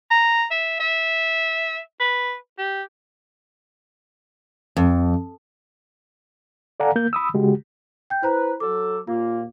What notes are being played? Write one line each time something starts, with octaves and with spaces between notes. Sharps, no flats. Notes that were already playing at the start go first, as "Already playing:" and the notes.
A#5
E5
E5
B4
G4
F2
A4 D5 F5 F#5 G#5 A#5
A#3 G6
B5 D#6 E6
C#3 G#3 F#4 G4
G5 G6
E4 B4 C5 A#5
F#3 A4 D6
D#2 A#2 A#3 F4